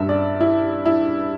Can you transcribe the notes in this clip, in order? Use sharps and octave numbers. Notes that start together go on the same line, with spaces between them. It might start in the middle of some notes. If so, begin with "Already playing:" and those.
Already playing: G2 E5
D5
E4
E4